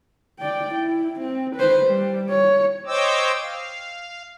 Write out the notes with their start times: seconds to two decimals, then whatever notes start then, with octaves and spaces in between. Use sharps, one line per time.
0.40 D5 G5
0.74 E4
1.20 C4
1.56 B4 C5
1.85 G3
2.29 C#5
2.86 C5 C#5 D#5 G5 D6 E6
3.42 F5